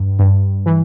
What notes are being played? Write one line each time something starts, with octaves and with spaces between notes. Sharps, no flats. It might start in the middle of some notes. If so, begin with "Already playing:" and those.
Already playing: G2
G2
E3